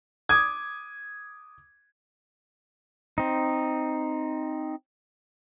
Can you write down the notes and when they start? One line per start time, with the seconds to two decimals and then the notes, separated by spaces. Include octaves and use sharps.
0.29 D6 D#6 G#6
3.18 C4 D#4